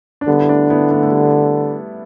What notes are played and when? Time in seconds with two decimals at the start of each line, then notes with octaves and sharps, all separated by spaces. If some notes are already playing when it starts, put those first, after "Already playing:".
0.21 D4
0.27 D3 G3 B3
0.40 E4
0.49 A3 D4
0.70 B3 E4
0.90 A3 D4
1.03 A3
1.12 G3 B3